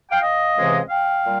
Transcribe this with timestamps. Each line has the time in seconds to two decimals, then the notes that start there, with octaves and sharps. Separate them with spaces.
0.11 F5 G5
0.22 D#5 F5
0.56 C#2 C3 E3 G#3 C4
0.89 F5 G5
1.24 A#2 G3